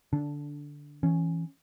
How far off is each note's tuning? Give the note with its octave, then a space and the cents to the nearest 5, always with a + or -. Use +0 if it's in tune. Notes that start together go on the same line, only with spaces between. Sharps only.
D3 +0 D4 -15
E3 +0 C#4 +0